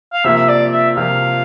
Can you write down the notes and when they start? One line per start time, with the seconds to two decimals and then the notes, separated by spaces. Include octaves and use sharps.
0.13 F5
0.24 C3 F3 A#3 E5
0.37 E5
0.49 D5
0.72 E5
0.97 C3 F3 A#3 F5